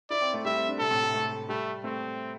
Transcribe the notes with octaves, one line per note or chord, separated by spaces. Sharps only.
E4 D5
C4
A3
G3 E5
C4
D4
C3 A4
A2
C3
A3
G3 A3
A3 C4